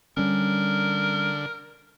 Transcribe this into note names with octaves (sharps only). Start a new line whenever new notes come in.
D3 G3 C#4 A#4